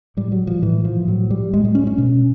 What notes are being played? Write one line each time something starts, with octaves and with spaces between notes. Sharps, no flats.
A2 G3
F#3
F3
A2 E3
F3
A2 F#3
G3
A2 G#3
G#3
C#4
C#4
B2